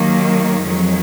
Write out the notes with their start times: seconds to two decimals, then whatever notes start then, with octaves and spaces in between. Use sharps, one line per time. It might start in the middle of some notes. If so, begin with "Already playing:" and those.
Already playing: D#2 D#3 F#3 A#3
0.62 F2 D#3 F#3 G#3